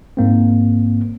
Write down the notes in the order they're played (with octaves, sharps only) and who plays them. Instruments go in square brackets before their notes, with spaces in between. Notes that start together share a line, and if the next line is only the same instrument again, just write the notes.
[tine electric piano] G#2 A#3 C4